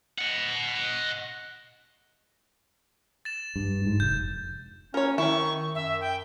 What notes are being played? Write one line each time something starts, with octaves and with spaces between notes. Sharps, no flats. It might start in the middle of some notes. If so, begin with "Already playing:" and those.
D#5 F#5
A6 E7
G2
G#2
F1 G6
C#4 A#4 C#5
D#3 E4 C#6
F#2 E5
G5